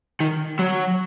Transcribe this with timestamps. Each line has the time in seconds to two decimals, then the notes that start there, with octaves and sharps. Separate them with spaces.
0.20 D#3
0.59 F#3